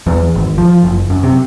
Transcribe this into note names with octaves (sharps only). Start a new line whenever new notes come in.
E2
G#1
F3
F#1
F#2
C3